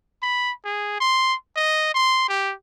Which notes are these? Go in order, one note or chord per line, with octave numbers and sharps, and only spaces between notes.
B5
G#4
C6
D#5
C6
G4